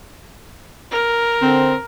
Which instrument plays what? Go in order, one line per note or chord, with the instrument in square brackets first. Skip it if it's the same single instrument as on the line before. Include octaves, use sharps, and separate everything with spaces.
[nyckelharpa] A#4
[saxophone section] D3 C4